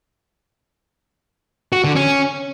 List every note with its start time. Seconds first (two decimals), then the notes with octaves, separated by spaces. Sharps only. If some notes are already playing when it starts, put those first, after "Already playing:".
1.72 F#4
1.84 D3
1.96 C#4